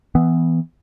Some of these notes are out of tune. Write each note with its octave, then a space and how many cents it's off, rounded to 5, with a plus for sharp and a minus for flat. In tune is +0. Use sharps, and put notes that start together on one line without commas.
E3 +0 B3 +10